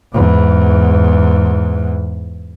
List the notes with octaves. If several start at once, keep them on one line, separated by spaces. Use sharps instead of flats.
E2 G#2